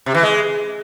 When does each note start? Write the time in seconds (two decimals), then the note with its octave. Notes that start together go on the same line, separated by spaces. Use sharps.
0.06 C3
0.14 E3
0.23 G#3